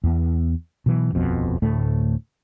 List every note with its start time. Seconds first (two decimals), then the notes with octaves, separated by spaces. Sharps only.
0.04 E2 B3
0.86 B2 E3 F#3
1.13 D#1 A#1 F2 B2
1.62 D2 A2 A3